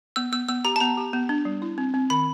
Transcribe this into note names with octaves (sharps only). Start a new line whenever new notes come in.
B3 E6
B3 E6
B3 E6
G4 A#5
A5
B3 A#5
G4
B3
D4
G3
E4
C4
C4
D#3 B5